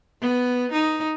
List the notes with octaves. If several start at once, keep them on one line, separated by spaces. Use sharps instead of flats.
B3
D#4